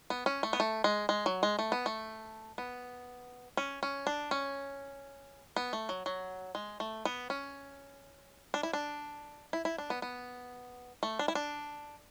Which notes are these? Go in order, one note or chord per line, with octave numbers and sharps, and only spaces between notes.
B3
C#4
A3
B3
A3
G#3
G#3
F#3
G#3
A3
B3
A3
B3
C#4
C#4
D4
C#4
B3
A3
F#3
F#3
G#3
A3
B3
C#4
D4
E4
D4
E4
E4
D4
B3
B3
A3
D4
E4
D4